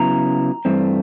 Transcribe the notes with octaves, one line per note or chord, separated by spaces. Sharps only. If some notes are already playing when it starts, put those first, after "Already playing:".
Already playing: C#3 F#3 B3 E4 A#5
G2 E3 A3 C4